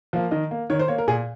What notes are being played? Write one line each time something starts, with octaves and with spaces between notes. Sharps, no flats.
F3 A#3
D#3 D#5
A#3
D#3 C#5
C5
A#3 C#5
A#4
A#2 G#4